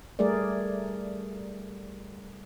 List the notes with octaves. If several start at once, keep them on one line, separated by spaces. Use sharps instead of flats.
G3 A3 G#4 A#4 D5